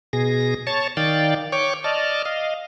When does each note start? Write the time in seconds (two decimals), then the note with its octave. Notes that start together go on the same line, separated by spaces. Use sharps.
0.13 B2 G#4 A#6
0.67 C#5 A5 C#6 A6
0.97 D#3 D5 F5 G5 A6
1.52 C#5 G5 C#6 D6
1.84 D5 D#5 A5 F6
2.25 D#5 F5